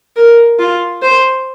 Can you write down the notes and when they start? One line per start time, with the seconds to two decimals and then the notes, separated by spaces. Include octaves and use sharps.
0.16 A#4
0.59 F4
1.02 C5